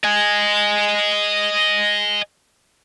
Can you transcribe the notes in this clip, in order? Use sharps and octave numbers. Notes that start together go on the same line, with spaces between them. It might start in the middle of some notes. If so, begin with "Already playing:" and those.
D#5 G#5